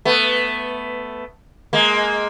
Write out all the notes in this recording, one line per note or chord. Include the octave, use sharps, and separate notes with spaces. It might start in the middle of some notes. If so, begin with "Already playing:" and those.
A3 B3
G#3 A#3